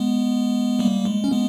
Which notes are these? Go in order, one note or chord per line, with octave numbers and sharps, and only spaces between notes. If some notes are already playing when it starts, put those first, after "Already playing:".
Already playing: G#3 B3
G3 A#3
G#3
C#4
G#3 B3